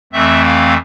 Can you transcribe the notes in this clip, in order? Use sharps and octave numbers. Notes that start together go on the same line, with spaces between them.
F2 E3 A3 C4 E5
F5